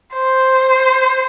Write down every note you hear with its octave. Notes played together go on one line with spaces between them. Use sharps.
C5